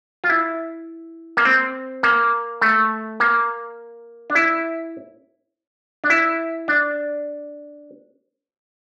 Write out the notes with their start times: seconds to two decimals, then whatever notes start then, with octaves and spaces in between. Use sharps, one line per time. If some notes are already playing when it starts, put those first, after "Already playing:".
0.24 F4
0.29 E4
1.37 A#3
1.45 C4
2.03 A#3
2.61 A3
3.20 A#3
4.30 D4
4.35 E4
6.04 D4
6.10 E4
6.68 D4